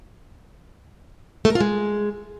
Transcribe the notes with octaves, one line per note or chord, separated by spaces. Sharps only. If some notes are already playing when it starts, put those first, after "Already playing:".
A3
A#4
F4
G#3